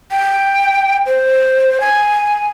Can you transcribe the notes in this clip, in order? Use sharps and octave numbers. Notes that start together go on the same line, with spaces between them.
G5
C5
G#5